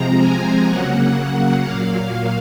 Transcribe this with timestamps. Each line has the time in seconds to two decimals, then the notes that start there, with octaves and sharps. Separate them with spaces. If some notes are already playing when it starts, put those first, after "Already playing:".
Already playing: C3 F3 G#3 C4 A#5
0.19 G#5
0.67 C#3 F#3 A#3 F#5
1.63 A#2 F#3 A#3 F5